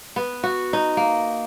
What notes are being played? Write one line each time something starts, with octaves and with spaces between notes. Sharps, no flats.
B3
F#4
D#4
A#3